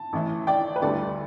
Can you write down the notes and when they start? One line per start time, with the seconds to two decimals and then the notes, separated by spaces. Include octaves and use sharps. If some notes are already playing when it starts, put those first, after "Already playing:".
Already playing: A5
0.13 A1 A2 E3
0.47 D5 G5
0.76 B4
0.82 D2 D3 G3 A4 D5